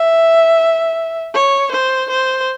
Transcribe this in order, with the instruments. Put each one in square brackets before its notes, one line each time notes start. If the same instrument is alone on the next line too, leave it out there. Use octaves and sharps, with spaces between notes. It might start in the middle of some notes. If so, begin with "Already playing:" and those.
Already playing: [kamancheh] E5
C#5
C5
C5